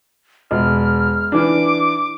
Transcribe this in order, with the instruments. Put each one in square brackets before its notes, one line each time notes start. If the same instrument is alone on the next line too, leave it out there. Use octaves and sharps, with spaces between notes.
[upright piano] E1 [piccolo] F6
[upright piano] E3 D4 [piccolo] D6